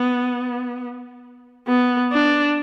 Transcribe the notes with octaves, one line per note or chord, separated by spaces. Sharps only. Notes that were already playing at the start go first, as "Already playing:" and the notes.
Already playing: B3
B3
D4